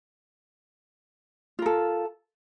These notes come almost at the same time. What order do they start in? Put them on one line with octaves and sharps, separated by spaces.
F4 A#4 A4